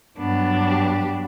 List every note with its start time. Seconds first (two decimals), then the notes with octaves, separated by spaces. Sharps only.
0.18 G2 F#3 B3 D4
0.65 G4